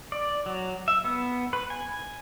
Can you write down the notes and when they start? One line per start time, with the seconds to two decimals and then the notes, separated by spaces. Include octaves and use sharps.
0.12 D5
0.46 F#3
0.88 E5
1.04 B3
1.53 B4
1.70 G#5